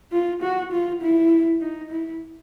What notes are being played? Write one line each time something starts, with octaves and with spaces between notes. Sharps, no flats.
F4
F#4
F4
E4
D#4
E4